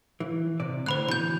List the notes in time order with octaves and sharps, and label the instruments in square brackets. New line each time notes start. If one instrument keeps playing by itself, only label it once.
[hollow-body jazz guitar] E3
C3 D5
[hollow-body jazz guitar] A2 D3 [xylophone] C5 B5 F#6
[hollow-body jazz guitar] B2 E3 [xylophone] B5 G6